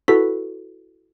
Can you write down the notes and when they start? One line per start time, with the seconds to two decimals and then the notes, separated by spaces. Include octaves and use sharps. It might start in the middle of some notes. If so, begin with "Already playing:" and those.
0.08 E4 F#4 A4 B4 B6